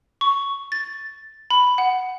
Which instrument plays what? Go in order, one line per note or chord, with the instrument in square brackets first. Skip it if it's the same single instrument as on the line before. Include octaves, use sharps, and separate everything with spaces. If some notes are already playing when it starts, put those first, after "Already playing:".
[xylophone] C#6
A6
B5
F#5